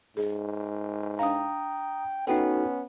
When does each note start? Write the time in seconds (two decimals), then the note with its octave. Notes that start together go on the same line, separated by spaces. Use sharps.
0.17 G#2 G#4
1.19 D4 F5 G5 A#5 D#6
2.27 B3 C#4 D#4 F#4 A4 G5